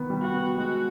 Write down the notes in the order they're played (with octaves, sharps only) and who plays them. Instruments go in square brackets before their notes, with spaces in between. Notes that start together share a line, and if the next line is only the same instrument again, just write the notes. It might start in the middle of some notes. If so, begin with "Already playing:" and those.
Already playing: [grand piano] D#3 B3
G3
[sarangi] F#4
[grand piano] B3
[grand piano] G#3 [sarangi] F#4